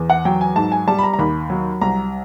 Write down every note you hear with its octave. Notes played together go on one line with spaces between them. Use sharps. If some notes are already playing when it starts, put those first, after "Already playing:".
Already playing: E2
F#5
F#3 G5
G#5
G#2 A5
G#5
G3 A5
B5
A#5
A#5
D#2 B5
F#3
C2 A#5